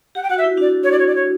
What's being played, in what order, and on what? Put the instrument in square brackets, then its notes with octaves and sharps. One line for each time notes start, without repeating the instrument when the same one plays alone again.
[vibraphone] G4 [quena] F#5
[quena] G5
[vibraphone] F#4 [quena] F#5
[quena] E5
[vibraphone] E4
[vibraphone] D4 F#4 [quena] D5
[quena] C#5
D5
C#5
D5
C#5